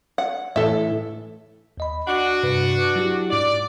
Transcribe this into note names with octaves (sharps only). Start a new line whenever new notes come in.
F#5
A2 E3 A4 E5
D#2 D#5 B5
D4 F#4 F#5
G2 C3 B4
F#3 E4 G4
G#2 D4 D5